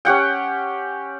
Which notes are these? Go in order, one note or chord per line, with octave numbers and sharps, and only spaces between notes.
C#4 G4 F#5 G5